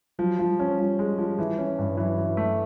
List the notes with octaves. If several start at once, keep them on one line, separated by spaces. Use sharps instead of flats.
F3 F#3
F3
G3
C#4
F3 G3
G#3
F3
E3
C#4
G2
E3 F#3
E3
A3